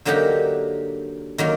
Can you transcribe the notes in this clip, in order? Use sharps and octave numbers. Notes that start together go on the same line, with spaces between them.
D3 F#3 A#3 D#4 G4
D#3 F#3 A#3